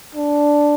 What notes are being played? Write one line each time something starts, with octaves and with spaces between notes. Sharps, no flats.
D4